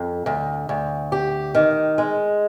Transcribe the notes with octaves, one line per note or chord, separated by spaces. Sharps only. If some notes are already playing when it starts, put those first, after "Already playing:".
Already playing: F2
D2
D2
G4
D#3
G#3